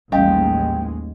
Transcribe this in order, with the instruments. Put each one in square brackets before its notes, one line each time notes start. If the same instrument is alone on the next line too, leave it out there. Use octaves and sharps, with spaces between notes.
[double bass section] A1 D#2 G#3 [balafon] G3 C#4 F5 [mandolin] G4